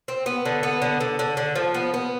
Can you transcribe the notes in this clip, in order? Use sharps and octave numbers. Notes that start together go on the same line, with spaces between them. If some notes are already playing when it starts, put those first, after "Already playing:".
C4
B3
D3
B3
D3
D3
D3
D3
F3
B3
B3